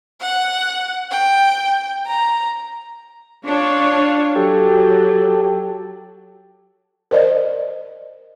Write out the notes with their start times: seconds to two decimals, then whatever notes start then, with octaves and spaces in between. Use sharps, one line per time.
0.21 F#5
1.11 G5
2.07 A#5
3.46 D4 F4 C#5
4.36 F#3 G4 A4
7.11 A#4 C5 D5 D#5